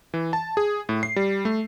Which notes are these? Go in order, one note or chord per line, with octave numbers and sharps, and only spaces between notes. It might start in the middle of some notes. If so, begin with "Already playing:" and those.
E3
A5
G#4
A2
C7
G3
A3